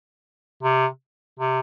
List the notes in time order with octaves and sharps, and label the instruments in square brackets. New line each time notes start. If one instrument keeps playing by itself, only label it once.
[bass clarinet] C3
C3